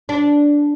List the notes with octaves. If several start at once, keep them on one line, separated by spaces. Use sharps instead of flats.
D4